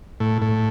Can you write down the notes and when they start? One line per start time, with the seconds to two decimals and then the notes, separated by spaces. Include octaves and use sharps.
0.20 A2
0.42 A2